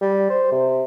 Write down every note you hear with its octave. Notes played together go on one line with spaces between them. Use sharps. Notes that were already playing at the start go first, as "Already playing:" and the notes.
G3
C5
C3